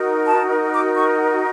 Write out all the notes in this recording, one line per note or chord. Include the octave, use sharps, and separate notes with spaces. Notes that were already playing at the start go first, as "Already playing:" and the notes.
Already playing: D#4 F#4 A#4
A5
D6
C#6